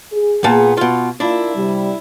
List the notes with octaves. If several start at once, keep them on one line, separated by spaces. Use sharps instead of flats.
G#4
A#2 B3 A5
B2 F4
A#3 D4 E4 F4
C3 G3